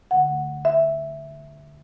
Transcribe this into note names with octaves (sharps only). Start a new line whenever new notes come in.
D2 D3 A3 F#5
E5